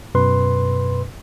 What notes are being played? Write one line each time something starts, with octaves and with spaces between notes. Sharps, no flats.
F#2 B2 B4 C6